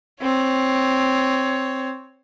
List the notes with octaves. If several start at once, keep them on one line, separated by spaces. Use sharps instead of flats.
C4 C#5